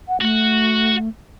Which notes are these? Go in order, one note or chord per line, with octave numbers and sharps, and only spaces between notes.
F#5
A3 F#4 F#5